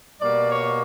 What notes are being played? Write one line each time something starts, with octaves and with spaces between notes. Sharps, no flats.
B2 G3 A#3 D5
C#5